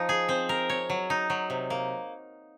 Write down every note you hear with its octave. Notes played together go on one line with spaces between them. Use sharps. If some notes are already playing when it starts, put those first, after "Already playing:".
Already playing: F3 D#4
G#4
C4
A#4
C#5
F#3
D#4
F#3
C3
A#3